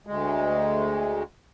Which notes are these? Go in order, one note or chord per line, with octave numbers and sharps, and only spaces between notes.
D2 G#3